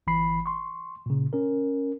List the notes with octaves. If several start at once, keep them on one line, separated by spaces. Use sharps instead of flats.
G1 E3 B5 C7
C6 C#6
A#2 C#3
C#4 A#4